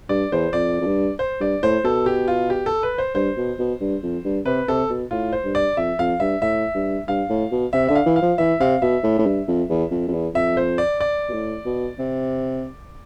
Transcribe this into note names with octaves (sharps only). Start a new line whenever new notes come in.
G2 D5
E2 C5
F2 D5
F2
G2
C5
G2 D5
A2 C5
B2 A4
G4
F4
G4
A4
B4
C5
G2 C5
B2
B2
G2
F2
G2
C3 B4
C3 A4
B2
A2 F4
C5
G2
D5
F2 E5
F2 F5
G2 E5
A2 E5
G2
G2 F5
A2
B2
C3 E5
D3 E5
F5
E3
F5
F3
E3 E5
C3 F5
B2 E5
A2
A2
G2
F2
E2
F2
F2
E2
F2 E5
C5
D5
D5
B2
A2
B2
C3